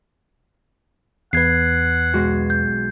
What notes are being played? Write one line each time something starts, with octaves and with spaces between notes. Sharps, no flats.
E2 B4 F#5 G#6 C7
B1 G#3 F#4
G6